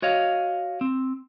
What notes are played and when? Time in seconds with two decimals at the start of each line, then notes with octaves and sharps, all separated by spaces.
0.02 F#4 C#5 D#5 F5
0.81 C4